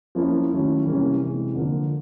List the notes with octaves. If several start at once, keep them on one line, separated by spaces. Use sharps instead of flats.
F3 A#3 C#4 E4
D#3 F#3 A3 C#4 E4
C3 E3 G3 A#3 C#4
C3 E3 G#3
D3 F3 A#3